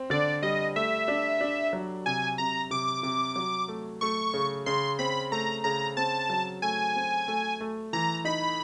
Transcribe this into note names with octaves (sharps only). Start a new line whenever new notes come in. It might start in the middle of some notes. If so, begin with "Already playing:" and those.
Already playing: C4
D3 D5
G3 D#5
A3 E5
D4
D4
F#3
C3 G#5
C3 A#5
C3 D6
C3
F#3
A3
A3 C#6
C#3
C#3 C6
C4 B5
A3 A#5
C#3 A#5
C4 A5
F#3
A3 G#5
C4
A3
A3
E3 A#5
D#4 B5